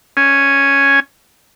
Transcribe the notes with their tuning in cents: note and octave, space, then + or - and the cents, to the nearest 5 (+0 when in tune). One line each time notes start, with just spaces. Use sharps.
C#4 +0 G#5 +0